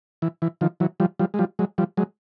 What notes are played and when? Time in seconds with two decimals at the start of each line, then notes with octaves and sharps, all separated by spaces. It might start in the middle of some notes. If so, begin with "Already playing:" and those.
0.22 E3
0.42 E3
0.61 D#3 F3
0.80 E3 F#3
1.00 F3 G3
1.19 F3 G3
1.34 G#3
1.39 F3 G3
1.59 F#3 G#3
1.78 F3 G3
1.97 F#3 G#3